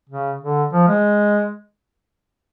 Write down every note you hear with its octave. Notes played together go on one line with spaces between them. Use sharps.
C#3
D3
F3
G#3